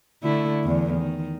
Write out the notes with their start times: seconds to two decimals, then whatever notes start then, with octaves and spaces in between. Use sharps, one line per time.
0.23 D3 A3 E4
0.64 E2 D3
0.96 D#3